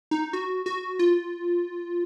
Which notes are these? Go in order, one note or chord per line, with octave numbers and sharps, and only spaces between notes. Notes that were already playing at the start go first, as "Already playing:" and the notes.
D#4
F#4
F#4
F4